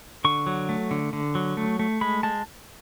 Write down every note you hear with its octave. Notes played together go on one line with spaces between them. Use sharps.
D3 C#6
F#3
A3
D3
D3
F#3
A3
A3
G#3 B5
G#3 A5